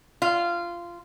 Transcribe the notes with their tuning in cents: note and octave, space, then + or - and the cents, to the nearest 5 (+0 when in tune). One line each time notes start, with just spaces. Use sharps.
F4 -15